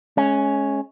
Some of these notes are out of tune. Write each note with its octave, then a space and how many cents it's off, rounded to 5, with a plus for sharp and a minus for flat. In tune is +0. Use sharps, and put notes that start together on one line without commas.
G#3 +30 C#4 +0